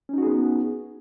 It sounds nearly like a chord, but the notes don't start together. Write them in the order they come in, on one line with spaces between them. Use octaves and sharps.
C#4 D#4 F#4 G#4 B3